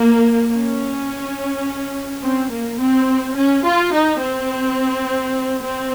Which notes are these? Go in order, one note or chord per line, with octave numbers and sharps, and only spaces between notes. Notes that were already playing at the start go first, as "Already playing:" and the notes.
Already playing: A#3
C#4
C4
A#3
C4
C#4
F4
D#4
C4
C4